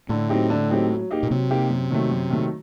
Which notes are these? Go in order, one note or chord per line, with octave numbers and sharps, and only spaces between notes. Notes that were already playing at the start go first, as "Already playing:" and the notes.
A2 D3
F#3 C4 D#4 G4
D3
F#3 C4 D#4 G4
F#3
A#3 D#4 G4
A#2
C3 F#3
A#3 D#4 G4
F#2
D#3 F#3 A3
F#2
D#3 F#3 A3